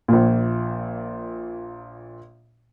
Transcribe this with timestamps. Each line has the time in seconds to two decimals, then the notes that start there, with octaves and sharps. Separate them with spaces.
0.08 A#1 A#2